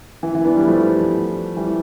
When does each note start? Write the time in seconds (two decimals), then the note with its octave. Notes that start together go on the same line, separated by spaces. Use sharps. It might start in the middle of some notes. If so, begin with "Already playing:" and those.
0.23 E3
0.35 E3
0.45 B3 D4
0.57 G3 B3
0.67 F3 A3
1.57 E3 G3